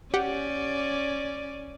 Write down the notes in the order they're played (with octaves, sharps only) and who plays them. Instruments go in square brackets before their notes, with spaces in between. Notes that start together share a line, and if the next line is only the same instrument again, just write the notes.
[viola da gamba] C#4 D5 [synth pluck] G4 F#5